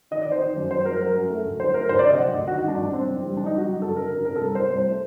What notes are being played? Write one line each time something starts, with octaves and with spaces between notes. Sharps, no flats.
D#3 D#5
D5
D#3 C5
D#3
F#2
F#2 C5
F#3 A#4
F#3 A#4
F#2
A3
D2
F#3 C5
A3 A#4
D2 C5
D5
C3
D#5
F#3 F#5
D2 D#5
D#3 F#4
D#4
G2 D4
A1 D4
G2 C4
F#1
G3
G3 D4
D#4
G3
F#4
F#1
F#2 A4
D3 A#4
F#2 A#4
C3 A#4
A4
C2 A#4
C3 C5
C2 C5
A3